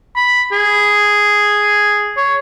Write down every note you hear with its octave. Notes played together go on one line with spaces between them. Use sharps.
B5
G#4
C#5